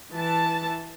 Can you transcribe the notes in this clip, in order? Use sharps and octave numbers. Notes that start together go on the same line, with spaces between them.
E3 A5